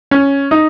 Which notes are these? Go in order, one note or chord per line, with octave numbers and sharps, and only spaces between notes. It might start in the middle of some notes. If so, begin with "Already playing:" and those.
C#4
D#4